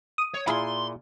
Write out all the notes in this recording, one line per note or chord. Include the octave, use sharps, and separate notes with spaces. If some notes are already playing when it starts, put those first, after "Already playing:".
D#6
C#5
A#2 E4 F4 G#4 B5 C6